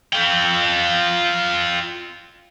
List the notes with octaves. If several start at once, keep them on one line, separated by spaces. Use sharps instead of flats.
F4 G5